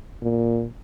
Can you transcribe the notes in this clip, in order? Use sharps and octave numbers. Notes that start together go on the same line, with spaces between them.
A#2